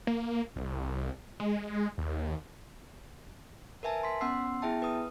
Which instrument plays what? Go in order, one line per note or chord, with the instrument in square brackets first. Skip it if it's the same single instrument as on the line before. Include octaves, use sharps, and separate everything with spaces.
[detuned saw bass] A#3
C2
G#3
D#2
[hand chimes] A#4 B4 E5 G#5 A5
C6 B6
B3 C#4 F#5 C6 E6 C7
B3 E4 G#4 E5 G5 A5
B4 D#6